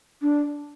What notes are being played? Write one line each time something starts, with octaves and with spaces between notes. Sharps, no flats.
D4